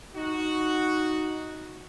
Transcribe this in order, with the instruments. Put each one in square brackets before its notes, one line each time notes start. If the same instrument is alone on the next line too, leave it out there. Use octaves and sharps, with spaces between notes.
[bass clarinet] D#4 [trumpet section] F#4